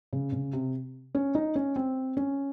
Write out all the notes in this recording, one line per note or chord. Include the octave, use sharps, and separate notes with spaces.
C#3
C#3
C3
C#4
D#4
C#4
C4
C#4